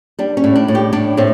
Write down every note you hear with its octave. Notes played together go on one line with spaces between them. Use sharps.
G3 D4
C#4
A2
D4
A2
G4
A2 D4
A2 C4